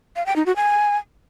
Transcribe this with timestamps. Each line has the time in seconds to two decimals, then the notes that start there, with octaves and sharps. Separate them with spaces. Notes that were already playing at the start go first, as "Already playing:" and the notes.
0.16 F5
0.26 G5
0.36 D#4
0.46 F#4
0.56 G#5